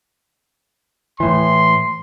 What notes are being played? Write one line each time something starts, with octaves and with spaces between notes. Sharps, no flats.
A2 E3 C6